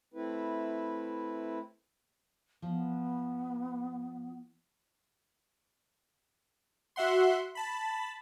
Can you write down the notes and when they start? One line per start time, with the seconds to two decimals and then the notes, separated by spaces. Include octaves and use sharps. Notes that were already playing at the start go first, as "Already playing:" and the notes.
0.14 A3 C4 E4 B4
2.62 F3 B3
6.96 F#4 E5 F#5 C6
7.55 A5 B5